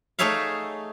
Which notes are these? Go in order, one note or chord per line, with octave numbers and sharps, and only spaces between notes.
A3 D#4 G#4 C#5 E5 F5